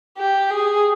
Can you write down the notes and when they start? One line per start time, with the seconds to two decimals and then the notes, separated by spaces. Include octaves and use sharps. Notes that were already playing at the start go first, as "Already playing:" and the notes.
0.17 G4
0.50 G#4